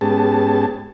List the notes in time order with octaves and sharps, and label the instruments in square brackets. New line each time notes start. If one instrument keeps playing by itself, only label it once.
[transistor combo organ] G#2 B3 C#4 G4 G#4 A5